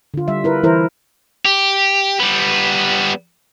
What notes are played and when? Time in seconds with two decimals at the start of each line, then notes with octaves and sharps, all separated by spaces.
0.14 D3 F4
0.28 G3 E5
0.44 E4 A#4 B4
0.63 E3 E4 A#4 C5
1.45 G4
2.20 G3 B3